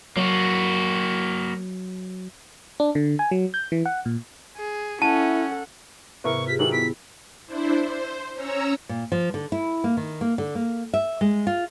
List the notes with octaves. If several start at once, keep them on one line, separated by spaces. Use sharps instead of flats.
F#3 A#3 F#4
D4
D3
G#5
F#3
G6
E3
F#5
A#2
G#4
C#4 E4 A4 F#5 A5
G#2 C3 B3 E4 A#4 C#6
F4 G4 G#4 B6
D#3 E3 F#3 F#7
B3 E4 B6
D4 E4 C5
C5
C#4 C#5 A#5 E6
A#2
F3
D3
E4
A#3
D#3
A#3
D3
A#3
E5
G#3
F4